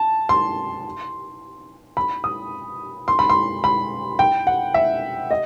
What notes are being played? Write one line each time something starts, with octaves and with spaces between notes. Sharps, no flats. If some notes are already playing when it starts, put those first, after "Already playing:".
Already playing: A5
C6
B5
D#6
C6
B5
C6
B5
G5
F#5
E5
D#5